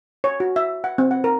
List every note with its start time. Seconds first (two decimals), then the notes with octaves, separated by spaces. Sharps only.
0.24 C#5
0.40 F#4
0.56 E5
0.84 F#5
0.98 C4
1.11 F#5
1.24 A#4